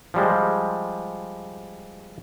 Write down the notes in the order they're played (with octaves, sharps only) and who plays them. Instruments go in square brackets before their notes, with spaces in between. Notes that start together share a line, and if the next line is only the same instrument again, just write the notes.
[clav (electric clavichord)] F3 G3 G#3